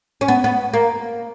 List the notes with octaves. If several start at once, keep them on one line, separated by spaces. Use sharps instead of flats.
C#4
B3
B3
A#3